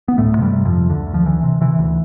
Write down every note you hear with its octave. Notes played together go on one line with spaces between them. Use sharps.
B3
D2 A2 A3
C3
G2 G3
C3
F2 F3
C3
D2 D3
D2
F3
D2 E3
C3
C3 E3
D2